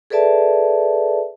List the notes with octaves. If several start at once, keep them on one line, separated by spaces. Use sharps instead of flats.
G#4 A4 B4 D5 E5 A5